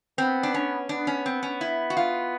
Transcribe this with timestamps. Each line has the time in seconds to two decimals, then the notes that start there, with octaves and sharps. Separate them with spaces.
0.18 B3 C4
0.43 D4
0.54 C#4
0.89 B3 D4
1.07 C#4
1.26 C4
1.43 C#4
1.61 E4
1.90 F#4
1.97 F4